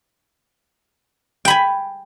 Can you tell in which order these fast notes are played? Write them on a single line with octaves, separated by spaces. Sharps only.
G5 B5 G#5